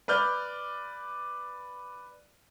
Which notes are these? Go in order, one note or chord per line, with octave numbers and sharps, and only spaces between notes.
B4 D5 F6 G6